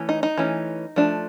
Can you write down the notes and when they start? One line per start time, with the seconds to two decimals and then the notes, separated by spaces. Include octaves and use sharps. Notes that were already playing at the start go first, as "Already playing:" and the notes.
Already playing: E3 A3 C#4
0.09 D#4
0.23 D#4
0.38 E3 A3 C#4
0.96 F3 A3 D4